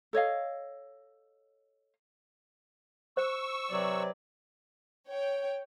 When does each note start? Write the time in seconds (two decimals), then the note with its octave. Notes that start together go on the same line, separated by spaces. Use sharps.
0.13 A4 C#5 D#5 F5
3.17 C5 C#6 E6
3.70 C3 F#3 B4 D5
5.08 C#5 G5